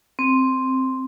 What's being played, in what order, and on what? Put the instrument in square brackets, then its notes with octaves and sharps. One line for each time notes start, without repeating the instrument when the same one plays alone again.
[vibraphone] C4